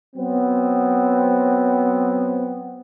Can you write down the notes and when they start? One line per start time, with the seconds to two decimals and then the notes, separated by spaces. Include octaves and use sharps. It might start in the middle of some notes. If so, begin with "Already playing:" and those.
0.16 F#3 B3 C4